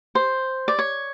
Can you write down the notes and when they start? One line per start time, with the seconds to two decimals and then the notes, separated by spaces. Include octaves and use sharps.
0.15 C5
0.68 D5
0.79 C#5